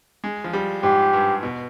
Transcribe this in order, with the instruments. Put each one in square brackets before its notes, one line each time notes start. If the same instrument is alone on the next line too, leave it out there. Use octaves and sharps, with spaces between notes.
[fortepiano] G#3
F3
G3
[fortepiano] G#2 [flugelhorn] G4
[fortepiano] G2
B2